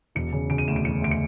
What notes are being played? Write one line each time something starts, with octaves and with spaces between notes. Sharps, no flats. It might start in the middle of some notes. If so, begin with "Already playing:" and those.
E1 C#7
C#3
C#3 D7
D#7
D2 E7
D7
E1 C#7
D2 D7
C#7